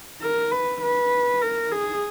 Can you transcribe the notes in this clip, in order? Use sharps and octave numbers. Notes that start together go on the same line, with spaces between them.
A#4
B4
B4
A#4
G#4